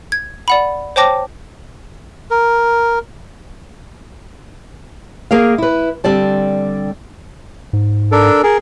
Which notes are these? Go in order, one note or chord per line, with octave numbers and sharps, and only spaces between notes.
G#6
D5 F#5 B5
C5 C#5 G5 A5 D6 A#6
A#4
A#3 G#4 A#4 F5
E4 B4
D3 G3 C4 D5 A5
G#2
D4 A4 A#4
G#4 A#4